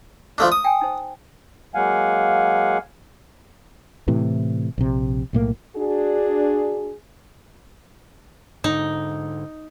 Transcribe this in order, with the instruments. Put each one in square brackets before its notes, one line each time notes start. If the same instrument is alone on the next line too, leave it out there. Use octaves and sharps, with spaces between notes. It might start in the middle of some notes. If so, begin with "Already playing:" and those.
[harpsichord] F3 A3 D4
D#6
[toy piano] G5 G#5
D#4 C5
[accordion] F#3 G#3 A#3 F5 F#5 G#5
[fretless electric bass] A2 C3 E3
A#1 C3
B1 A2 A#3
[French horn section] D4 F#4 G#4
[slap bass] G#2 D3 [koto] D#4